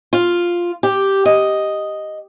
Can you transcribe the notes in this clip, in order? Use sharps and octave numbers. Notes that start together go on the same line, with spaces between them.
F4
G4
D#5